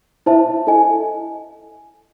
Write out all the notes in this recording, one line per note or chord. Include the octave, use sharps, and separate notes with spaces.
E4 C5 E5 A5
E4 A4 D#5 G#5